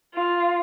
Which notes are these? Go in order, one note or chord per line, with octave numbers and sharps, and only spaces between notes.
F4